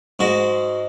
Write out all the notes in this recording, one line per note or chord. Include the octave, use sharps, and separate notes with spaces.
G#2 G#3 F#4